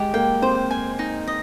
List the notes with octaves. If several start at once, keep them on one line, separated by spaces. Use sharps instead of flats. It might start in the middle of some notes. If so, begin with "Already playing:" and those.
Already playing: G#3 G4
A#3 G5
C4 C5
G#5
D#4
D#5